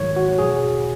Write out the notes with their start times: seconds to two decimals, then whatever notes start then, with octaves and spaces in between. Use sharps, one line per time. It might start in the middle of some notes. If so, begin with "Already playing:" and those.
Already playing: G#2 D#3 F#3 C#5
0.16 F#4
0.38 E2 B2 F#3 G#4